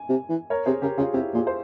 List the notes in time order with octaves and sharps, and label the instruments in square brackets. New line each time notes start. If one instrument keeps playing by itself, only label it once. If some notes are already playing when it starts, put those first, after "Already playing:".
Already playing: [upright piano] G#5
[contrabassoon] C3
E3
[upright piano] A#4 C#5
[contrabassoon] C3 [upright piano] G#4 C5
[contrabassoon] C#3 [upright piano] G4 A#4
[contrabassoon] C#3 [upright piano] F4 G#4
[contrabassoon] C3 [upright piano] E4 G4
[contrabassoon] A#2 [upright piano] F4 G#4
[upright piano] C5